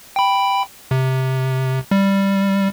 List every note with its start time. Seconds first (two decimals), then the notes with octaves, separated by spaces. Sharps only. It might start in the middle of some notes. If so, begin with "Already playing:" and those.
0.16 G5 B5
0.91 C3
1.91 G3